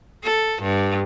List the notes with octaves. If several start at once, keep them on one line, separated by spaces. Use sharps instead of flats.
A4
G2